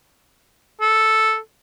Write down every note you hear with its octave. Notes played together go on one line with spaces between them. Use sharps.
A4